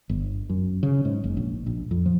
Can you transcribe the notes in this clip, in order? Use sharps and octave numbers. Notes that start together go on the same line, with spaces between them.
G1
F#2
C#3
G#2
F#1
A#1
A#1
F2
F3